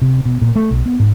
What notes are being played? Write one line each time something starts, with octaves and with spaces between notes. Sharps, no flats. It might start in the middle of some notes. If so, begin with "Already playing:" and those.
C3
B2
A#2
A3
B1
B3
G#2